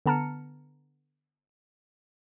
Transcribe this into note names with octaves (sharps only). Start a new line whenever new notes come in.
D3 B3 A5 A#5 F6 C#7